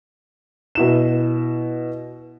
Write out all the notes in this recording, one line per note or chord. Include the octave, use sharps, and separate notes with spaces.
B2 E4 E7